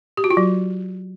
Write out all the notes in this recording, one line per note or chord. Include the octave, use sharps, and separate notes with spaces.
G4
F#4
F4
F#3